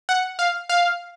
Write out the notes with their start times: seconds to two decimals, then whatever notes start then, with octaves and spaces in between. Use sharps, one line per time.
0.09 F#5
0.39 F5
0.69 F5